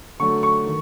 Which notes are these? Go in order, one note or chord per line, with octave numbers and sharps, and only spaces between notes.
D3 F#3 A3 C#6
C#6
D#3